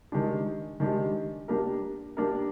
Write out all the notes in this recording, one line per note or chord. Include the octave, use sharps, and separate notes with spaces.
D#3 G#3 D4 G4
D#3 G#3 D4 G4
A#3 D4 G4 A#4
A#3 D4 G4 A#4